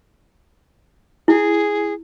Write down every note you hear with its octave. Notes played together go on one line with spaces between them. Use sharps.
E4 G#4